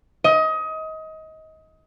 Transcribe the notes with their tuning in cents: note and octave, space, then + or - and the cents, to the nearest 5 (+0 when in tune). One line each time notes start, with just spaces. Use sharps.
D#5 +25